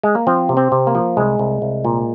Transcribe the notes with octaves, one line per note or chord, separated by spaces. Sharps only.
G#3
A#3
F3 C4
C3
C4
C3
A#3
F3
C2 G#3
C2
C2
A#2